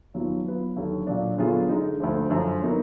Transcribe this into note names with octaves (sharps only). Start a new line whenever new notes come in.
D#2 D#3 F#3 B3 F4
F#3 B3 F4 B4
D#2 D3 F#3
A#2 F#3 D4
D3 F#3 B3 F4 G#4
D3 G#3 D#4
D2 D3 F3
F#2 D3 F3
F#3 B3 D#4 A#4